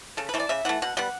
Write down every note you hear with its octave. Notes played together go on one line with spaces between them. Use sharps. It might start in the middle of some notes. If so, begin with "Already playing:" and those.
C#3 A4
B4
E3 A3
D5
C#3 E5
E3 A3 F#5
B2 F#5
G3 B3 F#5